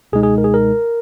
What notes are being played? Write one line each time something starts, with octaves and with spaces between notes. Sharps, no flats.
C#2 B2 G#3 D#4 G#4
G#4
A#4
G#4
A#4